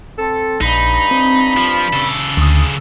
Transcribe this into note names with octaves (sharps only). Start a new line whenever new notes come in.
C4 A4
A#1 G2 D#4 B5
C4
F3
C#3 A4
D2 D#6